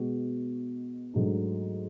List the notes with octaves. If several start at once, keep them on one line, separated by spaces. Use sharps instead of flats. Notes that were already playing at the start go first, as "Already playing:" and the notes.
Already playing: B2 G#3 B3 F#4
G#2 F#3 A3 D4